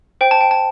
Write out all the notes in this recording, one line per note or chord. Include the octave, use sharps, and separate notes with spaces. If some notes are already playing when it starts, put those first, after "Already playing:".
C5 G5
A5
G5
A5